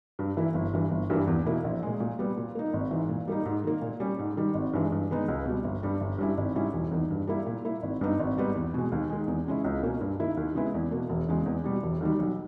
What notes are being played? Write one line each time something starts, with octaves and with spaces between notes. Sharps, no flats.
G2
E3 A#3 E4
G1
G2 E3
G1
G2 E3 G3 A#3
E2
B2 A#3 E4
A#1
A#2 G#3
A#2
G3 B3
A#2
A#3 D#4
G#1
G#2 E3
A#2
G3 A#3 D#4
G#2
D#3 A#3
A#2
G3 C#4
G#2
D#3 G3
G#1
G2 E3 G#3
G2
D#3 G#3 B3 D#4
C#2
B2 G3
G1
G2 G3
G1
G2 G3 C#4 E4
G#1
G#2 G3 C#4 E4
E1
E2 D#3
G2
G3 A#3 E4
A#2
A#3 E4
G#1
G2 G3 B3 D#4
G#1
G#2 G3 B3 D#4
E2
B2 G#3
D#2
D#3 G#3
E2
C#3 G#3 C#4 E4
C#2
B2 A#3 C#4
G2
D#3 A#3 E4
D#2
C#3 G#3 B3 E4
E2
B2 A#3
E1
E2 C#3 G#3
E2
B2 G3
E1
D#2 D#3 G3
B1